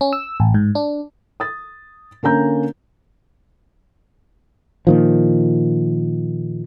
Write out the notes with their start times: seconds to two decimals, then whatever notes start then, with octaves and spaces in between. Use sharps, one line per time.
0.01 C#4
0.13 E6
0.40 A1
0.54 G#2
0.75 D4
1.40 D#6 A6
2.23 D3 A#3 C#4 A#5 G6
4.87 A#2 D#3 F3